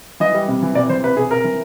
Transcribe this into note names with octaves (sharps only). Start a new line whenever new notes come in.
E3 D#5
G3
C3
E3
C3 D5
E3 C5
C3 B4
C3 G#4
C3 A#4
E3